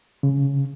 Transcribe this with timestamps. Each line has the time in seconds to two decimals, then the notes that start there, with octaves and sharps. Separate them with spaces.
0.23 C#3